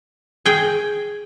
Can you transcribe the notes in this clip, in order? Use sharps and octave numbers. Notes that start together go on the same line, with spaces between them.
G#4 G5